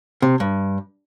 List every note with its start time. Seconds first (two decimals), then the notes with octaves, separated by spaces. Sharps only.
0.22 C3
0.40 G2